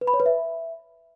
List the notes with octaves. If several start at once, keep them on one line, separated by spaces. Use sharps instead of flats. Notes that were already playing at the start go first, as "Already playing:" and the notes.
B4
B5
C#5
B4
E5